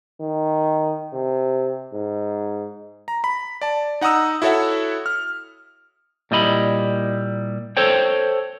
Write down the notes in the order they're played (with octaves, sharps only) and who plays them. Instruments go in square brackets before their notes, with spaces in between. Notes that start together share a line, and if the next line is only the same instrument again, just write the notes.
[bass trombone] D#3
C3
G#2
[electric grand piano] A#5
B5
D5 A5
D#4 F#5 A#5 D#6 E6
E4 F#4 A4 C#5 E5 F#5
F6
[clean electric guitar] A#2 G3 E4 D#5 B5
A4 C5 C#5 G5